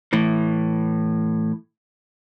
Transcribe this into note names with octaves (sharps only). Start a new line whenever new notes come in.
A2 E3